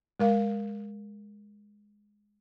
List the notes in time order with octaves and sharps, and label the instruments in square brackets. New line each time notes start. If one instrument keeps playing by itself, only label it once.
[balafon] G#3 A#4 F5